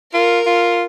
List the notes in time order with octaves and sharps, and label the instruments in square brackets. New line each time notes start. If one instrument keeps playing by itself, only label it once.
[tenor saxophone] F4 [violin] A#4
[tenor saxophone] F4